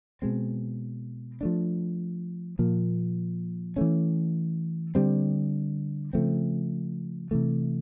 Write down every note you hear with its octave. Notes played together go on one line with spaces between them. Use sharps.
B2 G#3 C4
F3 A3 D4
A#2 F3 A#3
E3 A3 C#4
D3 G3 C4
C#3 F3 A3 C4
C3 E3 A3